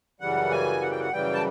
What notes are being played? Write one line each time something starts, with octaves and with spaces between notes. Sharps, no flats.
F#2 C#3 E3 G3 F#5
G#5
F#5
G5
F#5
F#2 C#3 E3 G3 G5
A5